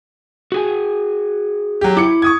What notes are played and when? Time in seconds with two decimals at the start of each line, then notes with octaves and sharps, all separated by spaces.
0.52 F#4 G#4 G#5
1.81 F#3 G4
1.97 E4 D6 C#7
2.22 C#6 D#6 G#6